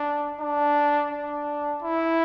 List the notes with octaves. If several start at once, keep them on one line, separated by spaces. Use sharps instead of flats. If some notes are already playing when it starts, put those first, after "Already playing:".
Already playing: D4
D4
D4
E4